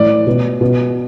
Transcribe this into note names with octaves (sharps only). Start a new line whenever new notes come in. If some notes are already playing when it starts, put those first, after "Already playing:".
Already playing: A2 E3 D5
B2
B2